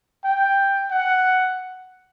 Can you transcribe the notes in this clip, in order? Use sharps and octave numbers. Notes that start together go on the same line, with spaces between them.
G5
F#5